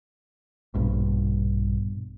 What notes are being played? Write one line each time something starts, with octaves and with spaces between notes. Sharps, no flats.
A#1 G2 B2